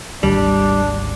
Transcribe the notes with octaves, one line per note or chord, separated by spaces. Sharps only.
G#1 D2 G3 D4